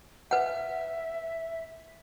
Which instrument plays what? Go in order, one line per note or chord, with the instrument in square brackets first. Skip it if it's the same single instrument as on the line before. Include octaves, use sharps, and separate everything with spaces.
[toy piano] B4 F#5 [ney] E5